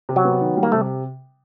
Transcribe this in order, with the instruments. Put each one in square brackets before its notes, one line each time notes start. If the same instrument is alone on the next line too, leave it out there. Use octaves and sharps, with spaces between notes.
[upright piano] C3
[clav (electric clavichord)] F#3
[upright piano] B3
D#3
G3
[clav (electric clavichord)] A#3
[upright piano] C3 [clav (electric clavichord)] A3